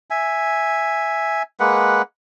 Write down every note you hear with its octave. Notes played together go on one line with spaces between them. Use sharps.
E5 G#5
G#3 A#3 B4 F#5